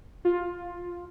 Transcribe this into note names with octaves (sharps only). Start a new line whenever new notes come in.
F4